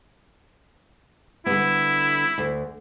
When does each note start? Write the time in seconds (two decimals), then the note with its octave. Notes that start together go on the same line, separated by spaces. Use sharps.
1.46 D3 G3 B3 E4
2.38 D2